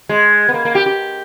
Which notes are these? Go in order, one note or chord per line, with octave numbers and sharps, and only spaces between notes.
G#3
B3
A#3
A#3
G4
G4